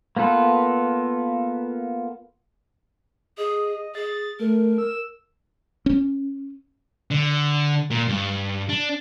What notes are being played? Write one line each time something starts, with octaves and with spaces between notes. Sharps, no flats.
A#3 B3 F4 A4 B4
G#4 D#5
G#4 A6
A3 A#4
E6
C#4
D3
A#2
G2
D4